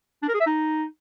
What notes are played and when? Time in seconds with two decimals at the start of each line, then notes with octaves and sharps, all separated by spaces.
0.22 D4
0.28 A#4
0.34 G#4
0.40 E5
0.46 D#4